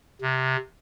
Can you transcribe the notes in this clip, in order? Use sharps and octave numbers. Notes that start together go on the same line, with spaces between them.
C3